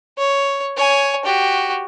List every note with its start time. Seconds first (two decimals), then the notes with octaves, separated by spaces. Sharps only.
0.18 C#5
0.76 C#5 G#5
1.25 F#4 G4